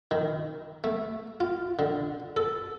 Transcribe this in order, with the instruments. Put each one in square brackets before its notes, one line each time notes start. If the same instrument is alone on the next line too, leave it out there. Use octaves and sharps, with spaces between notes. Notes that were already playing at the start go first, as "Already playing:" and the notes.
[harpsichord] D#3
A3
F4
D3
A4